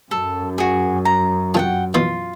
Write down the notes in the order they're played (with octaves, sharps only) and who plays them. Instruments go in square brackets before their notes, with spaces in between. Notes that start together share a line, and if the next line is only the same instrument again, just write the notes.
[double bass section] F#2 [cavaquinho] A4
[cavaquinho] F#4 G#4
A#5
[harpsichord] C2 F4 C6 [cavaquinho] F#5 G5 A5
[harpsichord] B2 E3 [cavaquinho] F4